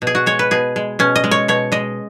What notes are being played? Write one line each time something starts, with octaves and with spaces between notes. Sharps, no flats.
B2
G#4
F#4
G#3 C#5
B4
B2 G#4
G#3
B2 C#4
D#5
G#3
C#5
B2 C#5
G#3 D#5